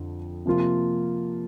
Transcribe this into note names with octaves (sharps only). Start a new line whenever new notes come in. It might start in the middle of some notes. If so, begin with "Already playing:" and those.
Already playing: F2 D3 F3
C3 F3 A#3 F4